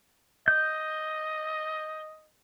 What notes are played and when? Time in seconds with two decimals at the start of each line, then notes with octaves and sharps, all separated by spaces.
0.48 D#5 G6